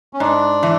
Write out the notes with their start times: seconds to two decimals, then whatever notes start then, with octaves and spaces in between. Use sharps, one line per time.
0.13 C#4
0.20 G#2 D4
0.63 E3